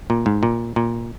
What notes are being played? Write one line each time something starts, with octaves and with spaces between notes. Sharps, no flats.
A#2
G#2
A#2
A#2